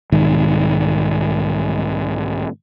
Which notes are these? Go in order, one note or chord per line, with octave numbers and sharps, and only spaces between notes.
B1 G#2 D#3